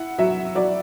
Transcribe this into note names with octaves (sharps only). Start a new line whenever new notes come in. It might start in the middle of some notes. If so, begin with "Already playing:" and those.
Already playing: E4 F#5
F#3 E5
F#3 D5